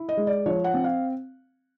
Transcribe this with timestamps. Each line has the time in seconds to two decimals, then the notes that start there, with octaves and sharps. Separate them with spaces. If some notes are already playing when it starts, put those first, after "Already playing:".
Already playing: E4
0.09 D#5
0.17 G#3
0.27 D5
0.46 F3 C#5
0.64 F#5
0.74 C4
0.84 F5